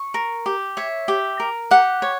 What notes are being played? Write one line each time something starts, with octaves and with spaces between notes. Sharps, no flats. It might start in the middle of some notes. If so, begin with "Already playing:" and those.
Already playing: C#6
A#4
G4
C#5 E5
G4
A#4
G4 F#5
C#5